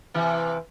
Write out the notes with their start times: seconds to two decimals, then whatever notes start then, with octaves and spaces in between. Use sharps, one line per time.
0.14 C3 E3